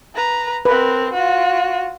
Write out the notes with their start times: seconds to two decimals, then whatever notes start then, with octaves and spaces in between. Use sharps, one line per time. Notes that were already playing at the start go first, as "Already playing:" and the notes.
0.15 B4 A#5
0.65 C4 A#4 B4
1.13 F4 F#4